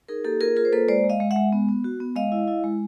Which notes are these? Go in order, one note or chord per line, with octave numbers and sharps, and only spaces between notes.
D#4 G#4 A#4
A#3 G4 A4
F4 G#4 A#4
F4 G#4 A#4
C5
A#3 A4 B4
G#3 C5 D5
G#3
D#5 F5
G#3
E5 F#5
G#3
B3
B3
F#4
B3
G#3 D#5 F5
E4
E4
G#3